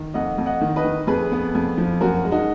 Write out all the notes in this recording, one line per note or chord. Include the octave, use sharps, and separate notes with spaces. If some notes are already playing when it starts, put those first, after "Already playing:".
Already playing: D#3
F2 D#5 F#5
F2
D#5 F#5
D#3
B4 D#5
D#3
F2 G#4 B4
B3
F2
F3
F#2 F#4 A#4
G#3
D#4 F#4